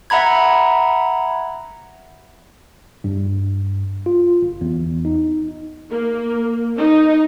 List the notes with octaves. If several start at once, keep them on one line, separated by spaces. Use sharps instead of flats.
E5 F#5 A#5 B5 G#6
G2
F4
G1
E2
D#4
A#3
D#4